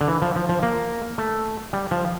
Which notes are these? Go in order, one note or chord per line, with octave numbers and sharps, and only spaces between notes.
D3
E3
F3
F3
F3
A#3
A3
G3
F3